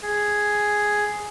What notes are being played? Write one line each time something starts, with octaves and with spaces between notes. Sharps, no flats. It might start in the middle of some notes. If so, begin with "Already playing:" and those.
G#4